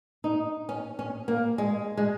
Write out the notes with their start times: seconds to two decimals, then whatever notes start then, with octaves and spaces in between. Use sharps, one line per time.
0.24 D#4
0.69 C#4
0.99 C#4
1.28 A#3
1.58 G#3
1.97 G#3